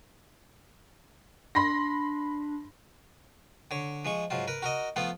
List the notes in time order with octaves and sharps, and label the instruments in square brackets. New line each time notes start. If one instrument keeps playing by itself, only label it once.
[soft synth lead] D4 [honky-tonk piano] B5 C6 A#6
[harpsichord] D3 C#5
F3 G#3 C#6
G#2 F#3 F4
A#4 B4
F#4 A#4 D#5
F3 A3 B3 F4